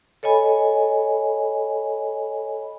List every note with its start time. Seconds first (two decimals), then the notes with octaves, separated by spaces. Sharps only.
0.23 A4 C#5 D#5 G#5 B5